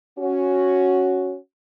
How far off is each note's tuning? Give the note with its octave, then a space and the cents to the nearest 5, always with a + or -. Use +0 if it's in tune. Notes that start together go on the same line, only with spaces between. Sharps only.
C#4 +0 F#4 +0